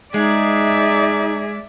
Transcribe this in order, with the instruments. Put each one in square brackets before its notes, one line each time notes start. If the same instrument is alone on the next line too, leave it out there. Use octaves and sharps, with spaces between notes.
[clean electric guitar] G#3 [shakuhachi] D#4 [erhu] G#4 [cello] D5 E5